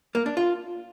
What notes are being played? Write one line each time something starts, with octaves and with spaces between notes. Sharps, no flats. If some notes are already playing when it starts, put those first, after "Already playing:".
A#3
D4
F4